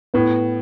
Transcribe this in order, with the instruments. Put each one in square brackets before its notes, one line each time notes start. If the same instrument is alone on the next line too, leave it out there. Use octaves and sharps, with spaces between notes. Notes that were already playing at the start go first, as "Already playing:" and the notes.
[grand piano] A2 [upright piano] B3